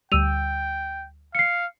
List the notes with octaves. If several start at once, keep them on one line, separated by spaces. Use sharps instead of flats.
D2 G3 G5 E6 D#7 F7
F5 C7 C#7